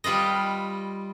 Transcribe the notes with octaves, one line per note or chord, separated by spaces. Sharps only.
G3 F4 B4 D#5